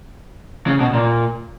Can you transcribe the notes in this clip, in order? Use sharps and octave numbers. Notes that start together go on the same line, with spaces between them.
C#3
B2
A#2